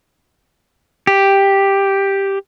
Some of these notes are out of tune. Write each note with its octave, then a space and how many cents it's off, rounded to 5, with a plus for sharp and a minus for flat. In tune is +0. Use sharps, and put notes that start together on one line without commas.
G4 +5